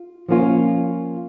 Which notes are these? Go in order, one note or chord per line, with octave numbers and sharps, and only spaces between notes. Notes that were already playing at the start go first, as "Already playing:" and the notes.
Already playing: F4
F3 A#3 C#4 F4